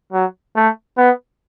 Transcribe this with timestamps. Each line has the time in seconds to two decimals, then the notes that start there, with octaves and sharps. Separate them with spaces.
0.12 F#3
0.56 A3
0.98 B3